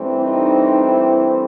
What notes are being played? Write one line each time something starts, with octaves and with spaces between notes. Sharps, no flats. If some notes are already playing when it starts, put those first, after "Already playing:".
Already playing: G2 E3 A3 C4
D#4
E4